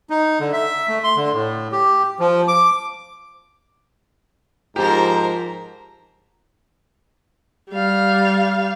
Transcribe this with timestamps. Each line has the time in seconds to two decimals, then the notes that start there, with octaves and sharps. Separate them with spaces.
0.10 D#4
0.40 D3
0.53 E5
0.88 A3
1.04 C6
1.16 D3
1.33 A2
1.72 G4
2.19 F3
2.48 D6
4.76 G#2 F3 G4 A#4 C5 A#5
7.70 G3 F5